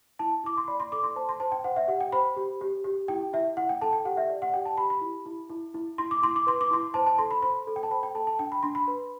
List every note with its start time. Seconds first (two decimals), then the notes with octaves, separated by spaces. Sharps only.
0.19 E4 A5
0.44 E4 D6
0.57 C6
0.68 D5 B5
0.80 C6
0.92 A4 D6
1.04 C6
1.16 C5 A5
1.29 C6
1.40 C5 A5
1.52 G5
1.64 C5 F#5
1.76 E5
1.88 G4 F#5
2.00 G5
2.12 C5 B5
2.37 G4
2.61 G4
2.84 G4
3.08 E4 G5
3.33 E4 E5
3.57 E4 F#5
3.69 G5
3.82 A4 A5
3.93 G5
4.05 G4 F#5
4.17 E5
4.30 D5
4.42 F#5
4.54 G4 G5
4.66 A5
4.78 G4 B5
4.90 B5
5.01 E4
5.26 E4
5.50 E4
5.74 E4
5.98 E4 C6
6.11 D6
6.23 E4 C6
6.36 D6
6.47 B4 C6
6.61 D6
6.71 E4 C6
6.94 C5 A5
7.07 A5
7.18 A4 C6
7.31 B5
7.42 C5 B5
7.67 A4
7.76 G5
7.83 A5
7.91 C5 B5
8.03 G5
8.15 A4 A5
8.27 A5
8.39 D4 G5
8.52 B5
8.63 D4 C6
8.75 B5
8.88 B4